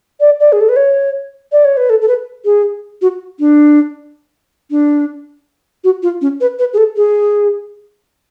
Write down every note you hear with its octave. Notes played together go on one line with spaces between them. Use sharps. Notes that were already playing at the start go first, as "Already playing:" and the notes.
D5
D5
G#4
A4
B4
C#5
D5
C#5
B4
A4
A4
B4
G#4
F#4
D4
D4
F#4
F4
C#4
B4
B4
G#4
A4
G#4